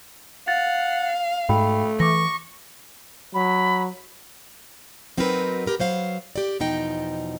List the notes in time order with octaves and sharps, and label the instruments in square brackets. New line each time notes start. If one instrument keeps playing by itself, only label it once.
[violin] F5 [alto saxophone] F#5 [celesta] A6
[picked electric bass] G#2 [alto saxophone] A3 [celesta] F#4 G5 B5
[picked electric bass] E3 [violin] C#6 [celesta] D6 A#6
[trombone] F#3 [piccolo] B5
[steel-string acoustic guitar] F#3 C4 D#4 F#4 A#4 B4
G4 A#4 B4
F#3 C5 F5
G4 D5
E2 B2 F3 D#4 G5